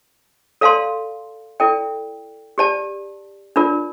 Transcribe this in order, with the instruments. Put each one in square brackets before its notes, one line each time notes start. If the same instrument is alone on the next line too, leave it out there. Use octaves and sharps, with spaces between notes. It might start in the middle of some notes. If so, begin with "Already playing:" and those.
[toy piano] A4 D5 F5 A5 C6
E4 A4 D5 G5
G4 D5 A5
D4 F4 A#4 D5